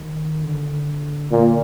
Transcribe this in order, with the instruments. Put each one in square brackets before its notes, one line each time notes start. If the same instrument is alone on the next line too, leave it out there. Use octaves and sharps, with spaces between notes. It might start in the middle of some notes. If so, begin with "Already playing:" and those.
Already playing: [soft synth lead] D#3
D3
[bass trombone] A#2